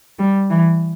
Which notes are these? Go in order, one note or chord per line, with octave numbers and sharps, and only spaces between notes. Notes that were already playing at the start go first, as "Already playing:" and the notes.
G3
E3